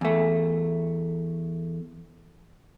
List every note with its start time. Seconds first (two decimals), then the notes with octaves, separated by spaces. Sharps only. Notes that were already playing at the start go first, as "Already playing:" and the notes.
0.01 E2 A3